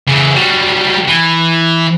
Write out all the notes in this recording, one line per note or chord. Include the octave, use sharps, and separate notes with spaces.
C#3 E3
F#3 G3
E3